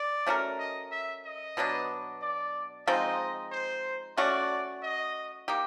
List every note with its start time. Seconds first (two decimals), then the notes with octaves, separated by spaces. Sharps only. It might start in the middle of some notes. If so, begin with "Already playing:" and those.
Already playing: D5
0.26 A3 C#4 F#4 A#4
0.59 D#5
0.92 E5
1.25 D#5
1.57 B2 F#3 B3 D4
2.22 D5
2.87 F3 G#3 C4 D#4 D#5
3.52 C5
4.17 A3 C#4 F#4 D5
4.82 D#5
5.48 A#3 D#4 G4